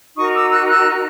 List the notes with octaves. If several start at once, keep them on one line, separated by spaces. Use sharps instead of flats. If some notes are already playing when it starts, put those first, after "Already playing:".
D#4 F#4 A#4 C#6 D#6
D6 E6
E6 F#6
E6 F#6